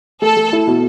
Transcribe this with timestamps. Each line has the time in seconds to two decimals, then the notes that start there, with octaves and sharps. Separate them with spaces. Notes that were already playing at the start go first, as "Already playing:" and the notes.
0.22 A3 A4
0.37 A3
0.53 E4
0.67 B2